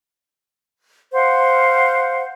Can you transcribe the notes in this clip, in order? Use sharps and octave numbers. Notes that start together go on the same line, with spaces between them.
C5 F5 F#5